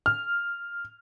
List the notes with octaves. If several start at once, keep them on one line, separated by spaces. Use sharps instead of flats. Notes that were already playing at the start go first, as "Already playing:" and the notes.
F6